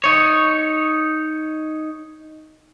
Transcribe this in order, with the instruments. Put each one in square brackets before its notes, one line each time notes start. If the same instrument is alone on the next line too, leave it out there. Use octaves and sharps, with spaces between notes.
[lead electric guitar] D#4 C#5